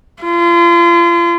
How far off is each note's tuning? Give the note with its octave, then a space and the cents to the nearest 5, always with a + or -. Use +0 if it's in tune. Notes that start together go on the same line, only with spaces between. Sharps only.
F4 -35